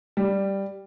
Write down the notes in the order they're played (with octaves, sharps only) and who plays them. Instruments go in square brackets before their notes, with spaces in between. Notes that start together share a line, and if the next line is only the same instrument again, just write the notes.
[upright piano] G3